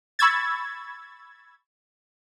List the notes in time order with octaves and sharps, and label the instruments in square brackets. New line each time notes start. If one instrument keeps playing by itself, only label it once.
[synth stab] B5 C#6 E6 G#6 A6